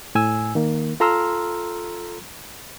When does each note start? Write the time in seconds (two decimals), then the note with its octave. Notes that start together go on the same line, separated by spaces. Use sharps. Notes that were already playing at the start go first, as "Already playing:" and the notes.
0.15 A2 G#5 E6
0.55 D#3 A#3
1.00 F4 A4 A#5 C6 E6 F6